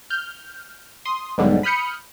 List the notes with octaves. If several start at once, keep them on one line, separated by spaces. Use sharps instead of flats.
F6 G6
C6 D#6
B1 G#2 D3 G3
B5 D#6 F6 G6 C#7